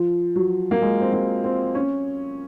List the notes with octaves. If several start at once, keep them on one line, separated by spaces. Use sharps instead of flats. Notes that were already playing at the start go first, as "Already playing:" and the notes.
Already playing: F3
F#3
A#3
G#3
C4
A#3
C4
C#4